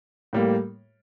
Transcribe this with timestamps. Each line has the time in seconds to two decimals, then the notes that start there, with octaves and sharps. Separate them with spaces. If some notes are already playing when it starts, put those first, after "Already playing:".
0.33 A2 G3 A#3